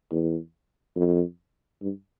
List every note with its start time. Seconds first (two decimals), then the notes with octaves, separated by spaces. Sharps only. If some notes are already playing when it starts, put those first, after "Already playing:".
0.11 E2
0.96 F2
1.82 G2